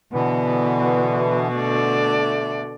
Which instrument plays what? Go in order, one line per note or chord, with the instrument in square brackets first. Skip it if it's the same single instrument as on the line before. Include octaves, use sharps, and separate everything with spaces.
[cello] B2 [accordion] D3 E3 B3
[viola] D3 D5 [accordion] A3